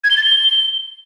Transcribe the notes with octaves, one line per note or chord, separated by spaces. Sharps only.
G#6
G7
A6
G7